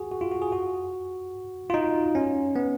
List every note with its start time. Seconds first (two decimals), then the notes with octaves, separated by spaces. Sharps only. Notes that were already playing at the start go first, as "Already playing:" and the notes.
Already playing: F#4 G#4
0.11 F#4
0.21 F4
0.31 F#4
0.42 G#4
0.52 F#4
1.70 F4
1.74 D#4
2.15 C#4
2.56 B3